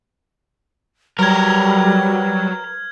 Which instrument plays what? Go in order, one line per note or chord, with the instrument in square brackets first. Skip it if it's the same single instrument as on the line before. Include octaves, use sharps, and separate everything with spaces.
[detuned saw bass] F#3 [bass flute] G3 [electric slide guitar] A#4 B4 A#5 [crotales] F6 G#6